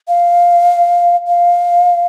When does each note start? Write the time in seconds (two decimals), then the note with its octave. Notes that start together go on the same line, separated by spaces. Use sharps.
0.08 F5
1.27 F5